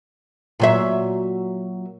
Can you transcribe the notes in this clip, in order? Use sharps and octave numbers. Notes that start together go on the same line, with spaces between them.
A#2 F#3 E5